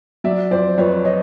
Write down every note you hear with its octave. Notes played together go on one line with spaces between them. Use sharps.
F#3 D5 E5
F2 C5 D5
F2 B4 C#5
C#5 D#5